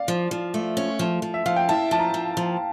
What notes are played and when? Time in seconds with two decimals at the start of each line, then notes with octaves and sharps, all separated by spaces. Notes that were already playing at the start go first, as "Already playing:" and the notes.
Already playing: D5 F5
0.08 F3
0.31 F3
0.54 A3
0.77 C#4
0.99 F3
1.22 F3
1.34 E5
1.46 F3 F5
1.56 G5
1.69 E4 A5
1.91 F3 A5
1.99 A#5
2.14 F3
2.37 F3